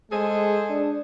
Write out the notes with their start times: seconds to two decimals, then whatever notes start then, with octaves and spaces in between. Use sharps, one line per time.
0.12 G#3 G#4 A4 C5
0.70 D4